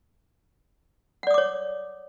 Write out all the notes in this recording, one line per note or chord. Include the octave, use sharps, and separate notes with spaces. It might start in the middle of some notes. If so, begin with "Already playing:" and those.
C#5 D5 F#5 D6 D#6